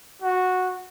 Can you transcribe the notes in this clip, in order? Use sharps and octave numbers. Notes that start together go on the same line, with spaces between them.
F#4